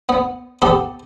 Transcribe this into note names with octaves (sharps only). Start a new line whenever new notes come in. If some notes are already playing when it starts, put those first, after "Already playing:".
B3
B3 G4 A4